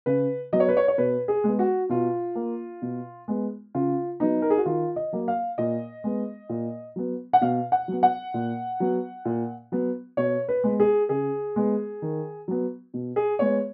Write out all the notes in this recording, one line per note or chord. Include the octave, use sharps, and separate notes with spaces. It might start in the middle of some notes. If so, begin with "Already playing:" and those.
C#3 B4
F#3 B3 D#5
C#5
B4
C#5
C#5
B2 B4
G#4
G#3 B3
F#4
B2 F4
A#3
B2
G#3 B3
C#3 F4
F#3 B3 D#4
A#4
G#4
F#4
D#3 F4
D#5
F#3 A#3
F5
A#2 D#5
G#3 B3
A#2
F#3 B3
F#5
B2 F5
F#5
F#3 B3
F#5
A#2
F#3 B3
A#2
F#3 B3
B2 C#5
B4
G#3 B3
G#4
C#3 G#4
G#3 B3
D#3
F#3 B3
B2
G#4
G#3 B3 C#5